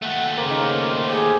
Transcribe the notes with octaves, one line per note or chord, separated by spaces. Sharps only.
D#2 A3 F#5
C#3 A#3 C5
D#3 A#4
G4 G#4